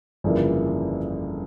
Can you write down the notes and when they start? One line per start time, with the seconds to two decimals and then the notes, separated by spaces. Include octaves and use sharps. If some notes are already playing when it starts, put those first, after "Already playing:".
0.24 G1 F2 C#3 E3 A#3